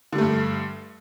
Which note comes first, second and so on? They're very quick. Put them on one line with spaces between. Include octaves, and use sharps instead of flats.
D3 G3 A3 G2